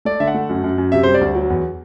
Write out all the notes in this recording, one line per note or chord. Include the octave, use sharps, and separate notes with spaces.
A3 D5
D3 E5
F#5
A3
F#2
F#2
F#2
C3 E5
G3 C5
D5
D2
F#3
E2